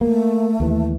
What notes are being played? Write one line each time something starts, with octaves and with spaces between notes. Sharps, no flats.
A3 A#3
D#2 E3